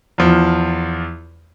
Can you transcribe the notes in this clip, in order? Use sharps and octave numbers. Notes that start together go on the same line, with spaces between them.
E2 F3